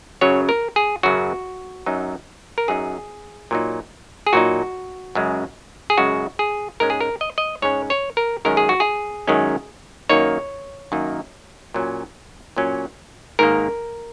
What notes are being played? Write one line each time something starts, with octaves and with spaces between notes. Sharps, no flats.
F#2 C#3 F#3 C#5
A#4
G#4
F#2 C#3 F#3 F#4
F#2 F#3 D#4
A#4
F#2 F#3 D#4 G#4
A#2 F#3 D#4
G#4
A#2 F#3 D#4 F#4
F#2 C#3 G#3
G#4
F#2 C#3 G#3 F#4
G#4
G#2 G#3 C#4 A#4
G#4
A#4
D#5
D#5
G#2 G#3 C#4 C#5
C#5
A#4
F#2 D#3 G#3 C#4 A#4
G#4
F#4
G#4
F#2 D#3 G#3 C#4
F#2 D#3 A#3 D#4 C#5
F#2 D#3 A#3 D#4
A#2 F#3 C#4
A#2 F#3 C#4
G#2 D#3 A#3 A#4